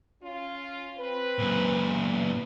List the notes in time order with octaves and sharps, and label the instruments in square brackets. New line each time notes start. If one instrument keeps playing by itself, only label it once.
[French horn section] C#4 F4
C4 B4
[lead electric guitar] F#2 A#2
[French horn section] B3